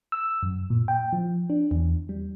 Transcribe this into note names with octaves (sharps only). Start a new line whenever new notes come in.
E6
F#2
A#2
G5
F3
D4
E2
G3